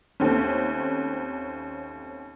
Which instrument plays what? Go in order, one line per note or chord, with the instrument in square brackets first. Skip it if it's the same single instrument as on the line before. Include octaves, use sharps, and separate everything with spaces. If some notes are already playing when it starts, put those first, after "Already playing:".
[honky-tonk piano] D#2 A3 C4 C#4